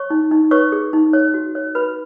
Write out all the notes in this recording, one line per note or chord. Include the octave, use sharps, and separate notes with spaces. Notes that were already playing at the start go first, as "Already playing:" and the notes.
Already playing: C#5 C#6
D#4
D#4
B4 C#5 C#6
G#4
D#4
C#5
F#4
C#5
F#4 B4 B5